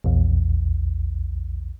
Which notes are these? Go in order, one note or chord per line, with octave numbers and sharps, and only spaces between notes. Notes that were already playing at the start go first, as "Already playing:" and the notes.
A#1 E2